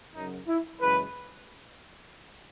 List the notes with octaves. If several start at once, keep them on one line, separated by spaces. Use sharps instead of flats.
F#2 C#3 F#3 D#4
E4
F#2 C#3 E3 G#3 B4